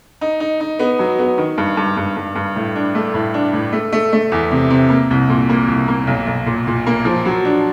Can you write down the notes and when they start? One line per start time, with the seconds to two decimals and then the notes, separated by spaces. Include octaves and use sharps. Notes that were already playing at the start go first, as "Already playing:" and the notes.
0.21 D#4
0.40 D#4
0.60 D#4
0.79 B3
0.99 F#3
1.19 B3
1.38 D#3
1.58 G2
1.77 G2
1.97 G2
2.16 G2
2.35 G2
2.56 A2
2.76 D4
2.95 A3
3.14 A2
3.34 D4
3.53 A2
3.73 A3
3.92 A3
4.13 A3
4.32 E2
4.51 C3
4.70 C3
4.90 A#3
5.10 C2
5.30 A#2
5.49 A#3
5.68 C2
5.88 A#3
6.07 B1
6.27 B1
6.46 A#2
6.67 A#2
6.86 A#3
7.05 F3
7.25 F#3
7.45 D4